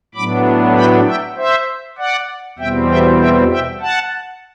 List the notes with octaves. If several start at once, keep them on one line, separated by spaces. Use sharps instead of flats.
A2 F#3 B3 D4 B5 D6
G5 B5
E5 G5
C5 E5
D5 F#5
E2 B2 G3 C4 E5 G5
E5 G5
E5 G5
E5 G5
F#5 A5